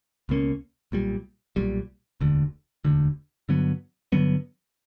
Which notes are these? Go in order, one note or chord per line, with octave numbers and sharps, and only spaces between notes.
C#2 B2 A#3 C#4
B1 A#2 G3
B1 A#2 G3
E1 D2 D3
E1 D2 D3
G2 D3 F#3 B3
G2 D3 F#3 B3